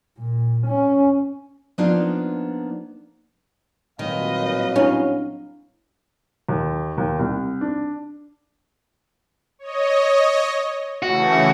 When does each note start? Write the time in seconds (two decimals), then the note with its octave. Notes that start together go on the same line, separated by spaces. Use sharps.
0.18 A#2
0.67 C#4
1.78 F3 A#3 B3 D4 D#4 F4
3.99 C2 A#2 D#3 F#3 B4 D#5 F5
4.76 C#4 D4 E4
6.49 D#2
6.98 D#2
7.19 C2
7.61 D4
9.59 C#5 D#5
11.02 C#3 E3 A3 F#4